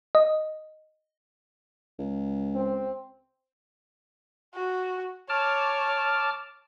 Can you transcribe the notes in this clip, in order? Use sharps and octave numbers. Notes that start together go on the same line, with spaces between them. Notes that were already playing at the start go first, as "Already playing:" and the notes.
D#5
C#2
C4
F#4
C#5 A5 D6 F6